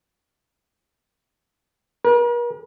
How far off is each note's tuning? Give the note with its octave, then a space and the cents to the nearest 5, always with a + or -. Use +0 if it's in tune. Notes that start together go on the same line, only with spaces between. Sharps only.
A#4 +45